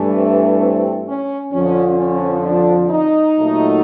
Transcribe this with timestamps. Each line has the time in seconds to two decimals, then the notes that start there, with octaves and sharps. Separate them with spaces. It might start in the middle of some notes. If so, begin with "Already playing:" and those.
Already playing: G2 E3 A3
0.14 C4
0.61 C4
1.07 C#4
1.52 F2 D3 F3 C#4
1.98 C#4
2.45 D4
2.91 D#4
3.37 A#2 F#3 A3